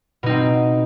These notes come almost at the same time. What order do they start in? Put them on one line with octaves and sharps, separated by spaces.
B2 D#4 C4